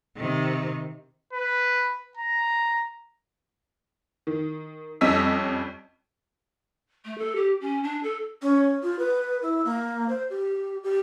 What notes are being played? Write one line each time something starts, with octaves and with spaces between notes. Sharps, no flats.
C3 D#3
B4
A#5
D#3
F2 G3 C#4 D#5 E6 B6
A3
A4
G4
C#4
D4
A4
C#4
F4
B4
E4
A#3
C5
G4
G4